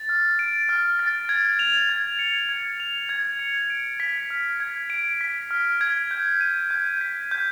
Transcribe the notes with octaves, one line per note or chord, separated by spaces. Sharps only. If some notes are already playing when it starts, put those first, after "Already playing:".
Already playing: A6
F6
D7
F6
A6
G#6
F7
G#6
C#7
G#6
F7
G#6
C#7
D7
B6
F6
G#6
D7
B6
F6
G#6
G6
D#7
G6
B6
G6